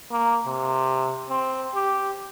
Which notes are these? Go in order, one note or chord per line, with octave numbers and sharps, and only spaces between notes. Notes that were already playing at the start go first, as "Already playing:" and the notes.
A#3
C3
C4
G4